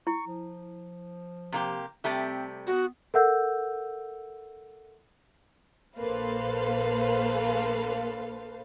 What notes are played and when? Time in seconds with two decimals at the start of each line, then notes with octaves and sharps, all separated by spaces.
0.07 E4 C#6
0.27 F3
1.52 C3 A#3 G4
2.04 C3 G3 A3 C4
2.67 B3 F#4
3.14 A4 A#4 E5 F#5 E6 G6
5.98 A#1 A#3 A4 B4 C5 F5